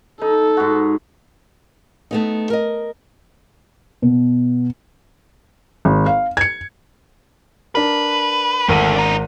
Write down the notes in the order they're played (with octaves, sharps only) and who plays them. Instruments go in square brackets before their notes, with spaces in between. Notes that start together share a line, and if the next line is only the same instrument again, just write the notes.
[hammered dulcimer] D#4 [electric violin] A4
[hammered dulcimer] G#2 F#4
[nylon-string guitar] A3 B3 D#4
A#4 D#5
[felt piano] B2
G#1
F5
G#6 C#7
[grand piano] D4 A#4 [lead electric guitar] B4
[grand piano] G#1 A#4 D#7 [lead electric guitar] D2 A3
[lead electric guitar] D4 D#4